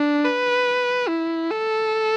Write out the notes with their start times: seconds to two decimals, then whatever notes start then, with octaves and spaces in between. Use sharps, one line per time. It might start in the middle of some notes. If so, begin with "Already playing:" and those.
Already playing: D4
0.24 B4
1.09 E4
1.51 A4